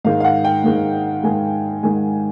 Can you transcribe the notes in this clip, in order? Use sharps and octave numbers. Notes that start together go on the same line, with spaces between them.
G#2 D#3 G#3 F5
F5
F#5
G5
G#2 D#3 G#3
G#2 D#3 G#3 G#5
G#2 D#3 G#3 G#5